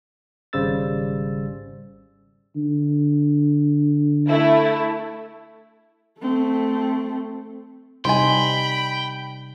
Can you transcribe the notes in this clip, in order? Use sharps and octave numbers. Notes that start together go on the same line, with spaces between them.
G#1 C#3 G3 C5 E6 A6
D3
A3 E4
A3 C4
C3 G3 D#4 C5 D#5 G5 G#5 B5